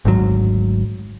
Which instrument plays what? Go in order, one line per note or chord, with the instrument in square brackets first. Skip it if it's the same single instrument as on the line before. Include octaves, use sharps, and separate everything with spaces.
[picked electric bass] G#1 D2 G#2 F#3